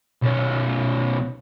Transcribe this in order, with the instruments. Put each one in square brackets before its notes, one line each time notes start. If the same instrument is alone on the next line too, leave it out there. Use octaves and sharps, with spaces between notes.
[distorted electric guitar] B1 C#4